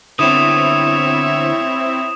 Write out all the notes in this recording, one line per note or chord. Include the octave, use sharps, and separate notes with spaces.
D3 B3 C4 E4 C#5 E5 D#6 E7